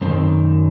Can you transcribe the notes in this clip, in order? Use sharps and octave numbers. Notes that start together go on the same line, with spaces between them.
F#2 D#3 C4